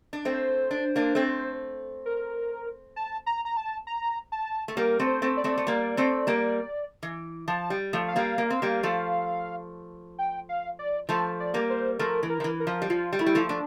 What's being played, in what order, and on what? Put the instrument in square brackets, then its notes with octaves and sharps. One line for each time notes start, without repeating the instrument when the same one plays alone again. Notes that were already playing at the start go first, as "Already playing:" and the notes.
[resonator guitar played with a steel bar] D4
[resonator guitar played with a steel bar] A3 C4 [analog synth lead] C5
[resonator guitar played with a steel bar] D4
A#3 D4
A3 C4
[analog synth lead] A#4
A5
A#5
A#5
A5
A#5
A5
[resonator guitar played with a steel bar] A3
[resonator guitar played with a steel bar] G3 A#3 [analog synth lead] A#4
[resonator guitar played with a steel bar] A3 C4
[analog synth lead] C5
[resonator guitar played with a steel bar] A3 C4
[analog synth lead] D5
[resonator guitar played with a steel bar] A3 C4
A3
G3 A#3
A3 C4
G3 A#3
E3
[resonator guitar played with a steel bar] F3 [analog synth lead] A5
[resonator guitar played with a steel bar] G3
F3 A3
[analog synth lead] F5
[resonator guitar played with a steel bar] G3 A#3
A#3
C4
G3 A#3
F3 A3
[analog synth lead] G5
F5
D5
[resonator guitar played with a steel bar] F3 A3 [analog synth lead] A5
[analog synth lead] D5
[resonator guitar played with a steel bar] G3 A#3
[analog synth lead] C5
[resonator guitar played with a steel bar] F3 A3 [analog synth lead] A#4
[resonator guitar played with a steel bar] E3
[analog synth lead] A#4
[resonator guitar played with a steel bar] F3
E3
[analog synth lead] A#4
[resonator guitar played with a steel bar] F3
G3
[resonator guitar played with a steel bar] F3 [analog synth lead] F4
[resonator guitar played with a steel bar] G3
[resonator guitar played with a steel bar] A3 [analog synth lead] E4
[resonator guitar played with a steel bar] G3
F3 A3
[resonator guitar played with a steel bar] A3 [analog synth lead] D4